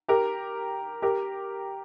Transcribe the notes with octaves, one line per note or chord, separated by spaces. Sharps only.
G4 A#4
G4 A#4